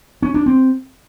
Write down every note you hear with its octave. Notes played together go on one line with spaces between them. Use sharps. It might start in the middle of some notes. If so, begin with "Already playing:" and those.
C#4
D4
C4